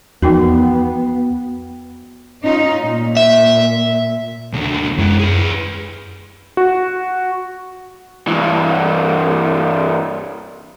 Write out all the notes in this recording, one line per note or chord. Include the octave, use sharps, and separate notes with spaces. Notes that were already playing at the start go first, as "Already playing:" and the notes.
E2 F3 B3 D#4 F#4 A#4 G5
C#4 D#4 F4
A#2
E5
D#2 D3
F#2 G#3 E4
G#4 B4
F#4
G2 E3